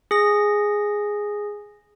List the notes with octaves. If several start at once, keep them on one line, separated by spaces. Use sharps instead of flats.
G#4 A#6